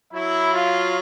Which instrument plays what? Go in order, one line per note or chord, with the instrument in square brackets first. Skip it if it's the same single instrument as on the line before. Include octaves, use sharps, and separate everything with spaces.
[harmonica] F#3 [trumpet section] E4
[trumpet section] F4